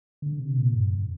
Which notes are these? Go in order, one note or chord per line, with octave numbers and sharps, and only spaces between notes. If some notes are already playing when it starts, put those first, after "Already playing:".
D3
C3
A#2
G2
F2